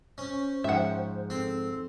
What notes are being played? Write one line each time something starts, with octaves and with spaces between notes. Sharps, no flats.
C#4 C5
G#2 F3 E5 F#5
C4 A4